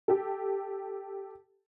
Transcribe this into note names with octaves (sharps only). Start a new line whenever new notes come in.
G4 A4